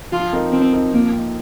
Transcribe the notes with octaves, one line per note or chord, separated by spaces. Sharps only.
F3 F4
C4 D#4 A#4
F3 C4
C4 D#4 A#4
F3 A#3
C4 D#4